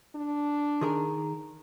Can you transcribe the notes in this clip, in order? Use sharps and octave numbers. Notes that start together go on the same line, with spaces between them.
D4
D#3 G#4 A#4